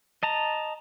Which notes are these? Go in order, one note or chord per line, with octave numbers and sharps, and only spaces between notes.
D#5 A5 A#5